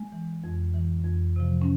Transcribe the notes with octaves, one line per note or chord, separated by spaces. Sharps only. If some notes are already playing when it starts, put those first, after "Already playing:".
Already playing: G#3
E3
F2
E3
F2
C3 F3
C#4